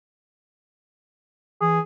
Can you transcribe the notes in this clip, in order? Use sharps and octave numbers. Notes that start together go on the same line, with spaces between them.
E3 G#4